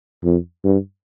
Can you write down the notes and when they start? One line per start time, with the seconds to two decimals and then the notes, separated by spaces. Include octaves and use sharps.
0.24 F2
0.65 G2